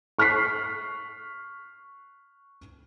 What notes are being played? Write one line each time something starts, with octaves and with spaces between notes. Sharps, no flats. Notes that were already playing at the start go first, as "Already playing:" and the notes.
C#6 F6 F#6 B6 C7